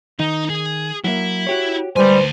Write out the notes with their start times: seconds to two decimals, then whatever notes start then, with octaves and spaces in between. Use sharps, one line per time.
0.20 D#3 D#4
0.50 G#4
1.04 F#3 A#3 E4 E5
1.47 F#4 G4 C#5
1.96 D2 G#2 G3 B4 C5 G#5